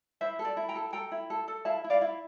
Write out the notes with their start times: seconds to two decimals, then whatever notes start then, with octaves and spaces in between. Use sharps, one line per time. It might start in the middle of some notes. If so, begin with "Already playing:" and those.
0.21 E4 C5 E5
0.39 A4
0.45 D5
0.57 E4
0.69 G5 A#5
0.75 A4
0.93 A4 G5 A#5
1.12 E4
1.30 A4
1.48 A4
1.65 E4 F5 A5
1.84 E4
1.90 D5 F5
2.01 E4